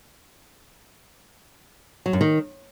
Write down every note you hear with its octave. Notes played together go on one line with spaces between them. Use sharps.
F#3
F#2
D#3